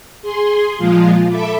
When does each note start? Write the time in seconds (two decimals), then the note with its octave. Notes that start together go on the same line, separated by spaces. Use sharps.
0.22 G#4 C6
0.78 A#2 F3 G#3 F4
1.27 A4 E5 B5 D6